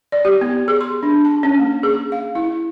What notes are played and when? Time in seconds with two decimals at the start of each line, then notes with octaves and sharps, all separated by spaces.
0.12 D5
0.25 G4
0.41 B3
0.68 G#4
0.81 C6
1.03 D4
1.25 A5
1.43 C#4
1.59 A#3
1.83 G#4
2.12 F5
2.35 E4